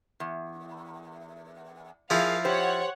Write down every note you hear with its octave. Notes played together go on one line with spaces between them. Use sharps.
E2
F3 E4 G#4 A#4 F5
G4 C5 C#5 F#5